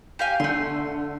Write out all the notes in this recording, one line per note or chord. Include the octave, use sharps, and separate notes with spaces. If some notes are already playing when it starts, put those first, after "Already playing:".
G4 F5 G#5
D3 A3 C6